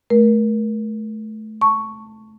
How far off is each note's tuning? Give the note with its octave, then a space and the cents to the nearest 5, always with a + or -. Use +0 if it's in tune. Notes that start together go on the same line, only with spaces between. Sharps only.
A3 -25 A#4 +30
A5 +15 C#6 +0